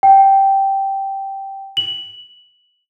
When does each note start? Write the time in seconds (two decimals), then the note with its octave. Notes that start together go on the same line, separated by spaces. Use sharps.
0.03 G5
1.77 F#7